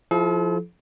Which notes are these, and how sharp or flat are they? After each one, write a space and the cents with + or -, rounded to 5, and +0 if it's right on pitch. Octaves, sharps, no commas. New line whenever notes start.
F3 +0 E4 +0 A4 -45